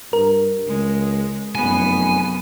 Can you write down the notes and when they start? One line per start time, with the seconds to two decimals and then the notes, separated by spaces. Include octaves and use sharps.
0.13 G2 A#4
0.67 C#2 G#3
1.55 F1 F#2 B3 G#5